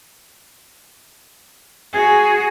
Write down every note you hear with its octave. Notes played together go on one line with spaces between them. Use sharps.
F#4 G#4